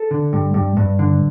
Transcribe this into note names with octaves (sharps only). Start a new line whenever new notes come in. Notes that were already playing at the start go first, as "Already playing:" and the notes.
Already playing: A4
D3
G2
G2
G2
D3